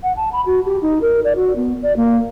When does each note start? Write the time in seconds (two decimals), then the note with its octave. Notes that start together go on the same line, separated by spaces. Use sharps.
0.03 F#5
0.17 A5
0.33 B5
0.46 F#4
0.65 G4
0.82 D#4
1.01 A#4
1.24 D5
1.36 F#4
1.56 B3
1.82 D5
1.96 A#3